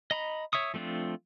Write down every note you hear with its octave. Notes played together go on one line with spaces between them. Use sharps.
D#5 A#5 B5
C#5 E5 C#6 D#6
F3 A3 C4 D4 F4